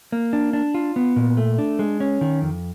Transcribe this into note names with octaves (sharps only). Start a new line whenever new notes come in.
A#3
D4
D4
F4
B3
A#2
A3
D4
G#3
C#4
D#3
F2